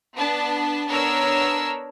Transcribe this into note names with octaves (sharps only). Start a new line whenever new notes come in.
B3 D4 A5
B3 D4 A#4 C#5 E6